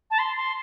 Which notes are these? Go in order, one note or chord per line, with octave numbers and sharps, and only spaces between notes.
A5
C6
C6